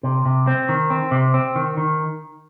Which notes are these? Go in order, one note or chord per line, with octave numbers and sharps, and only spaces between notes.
C3
C3
C4
D#3
C4
C3
C4
D#3
D#3